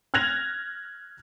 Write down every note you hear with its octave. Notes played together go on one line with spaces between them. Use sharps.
F6 F#6 G#6 A#6 F7